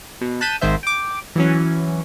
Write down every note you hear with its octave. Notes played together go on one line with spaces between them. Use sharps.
B2
A5 F#6 G6 B6 D#7 E7
G#1 G#2 D#3 C5 E5
G5 D6
E3 F#3 C#4